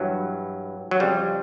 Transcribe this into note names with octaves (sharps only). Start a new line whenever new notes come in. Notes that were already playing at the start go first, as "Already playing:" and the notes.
Already playing: G2 E3 F#3
F#3
F2 C#3 F3 G3